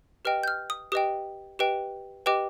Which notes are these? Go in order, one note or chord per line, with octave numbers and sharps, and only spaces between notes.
G4 B4 D#5 G5 F6
G6
F6
D#6
G4 B4 D#5 G5 D#6
G4 B4 D#5 G5
G4 B4 D#5 G5 D6